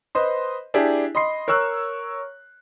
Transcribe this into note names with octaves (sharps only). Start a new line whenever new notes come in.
B4 C5 D#5 C6
D4 E4 G4 G#4
D#5 B5 C6 C7
A#4 C#5 C#6 E6 F#6